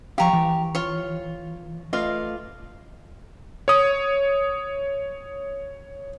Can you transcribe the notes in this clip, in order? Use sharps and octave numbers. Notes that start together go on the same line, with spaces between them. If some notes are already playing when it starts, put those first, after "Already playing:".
F3 G4 F5 A#5 C#6
E3
F4 C#5
A3 F4 B4 D5 D#5 F5
C#5 D#6